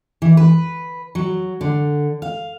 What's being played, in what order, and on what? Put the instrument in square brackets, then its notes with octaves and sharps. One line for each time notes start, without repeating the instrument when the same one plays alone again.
[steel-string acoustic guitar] E3
B4
F#3
D3
F5